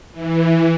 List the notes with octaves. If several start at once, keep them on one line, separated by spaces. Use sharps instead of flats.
E3